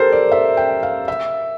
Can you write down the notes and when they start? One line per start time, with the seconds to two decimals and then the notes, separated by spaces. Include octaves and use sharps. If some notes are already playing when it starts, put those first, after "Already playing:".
Already playing: G4 A4 A#4 C5
0.12 D5
0.32 E5
0.57 G5
0.83 F5
1.08 E5